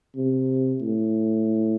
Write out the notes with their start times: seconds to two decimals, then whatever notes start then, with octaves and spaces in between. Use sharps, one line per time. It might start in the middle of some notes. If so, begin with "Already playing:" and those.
0.16 C3
0.82 A2